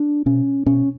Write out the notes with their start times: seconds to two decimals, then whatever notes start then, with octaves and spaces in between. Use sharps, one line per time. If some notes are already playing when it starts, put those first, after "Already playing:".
Already playing: D4
0.26 B2 C#4
0.66 B2 C#4